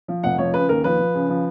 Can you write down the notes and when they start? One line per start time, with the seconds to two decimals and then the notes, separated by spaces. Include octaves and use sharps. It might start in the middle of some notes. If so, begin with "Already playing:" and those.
0.08 F3
0.23 F1 F#5
0.38 F3 C#5
0.54 C#3 B4
0.69 D#2 A#4
0.84 F3 B4
0.99 F3
1.15 C#3
1.29 F3